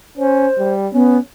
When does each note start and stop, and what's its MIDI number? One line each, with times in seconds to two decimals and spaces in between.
0.18 0.47 61
0.18 0.74 72
0.58 0.88 55
0.93 1.18 59
0.93 1.18 61